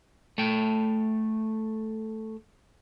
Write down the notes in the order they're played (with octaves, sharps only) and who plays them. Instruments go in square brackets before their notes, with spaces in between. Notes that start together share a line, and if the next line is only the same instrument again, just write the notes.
[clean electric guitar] A3 G5